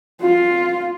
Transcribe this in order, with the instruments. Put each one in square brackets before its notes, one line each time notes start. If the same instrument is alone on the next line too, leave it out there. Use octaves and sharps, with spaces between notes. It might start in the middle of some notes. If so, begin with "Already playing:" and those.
[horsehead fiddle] F4